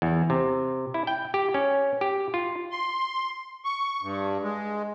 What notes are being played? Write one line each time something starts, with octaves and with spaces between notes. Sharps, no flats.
E2
C3
E4
G5
G4
C#4
G4
F4
C6
C#6
G2
G#3